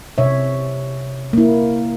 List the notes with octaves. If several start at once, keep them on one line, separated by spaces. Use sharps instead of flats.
C3 C#5 E5
A#3 E4